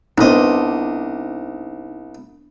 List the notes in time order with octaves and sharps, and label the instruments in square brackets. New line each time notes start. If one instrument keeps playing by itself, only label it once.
[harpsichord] C2 D#5 [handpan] B3 D4 [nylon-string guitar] D#4 C5